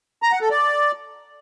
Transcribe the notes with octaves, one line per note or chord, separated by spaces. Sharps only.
A#5
F#5
A4
D5